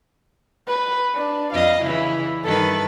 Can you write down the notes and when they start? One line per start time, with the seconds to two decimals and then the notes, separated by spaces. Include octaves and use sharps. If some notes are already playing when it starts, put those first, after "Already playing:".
0.67 B4
1.14 D4
1.53 F2 D#5 F5
1.81 C#3 E3 E4
2.44 G2 D#3 A4 B4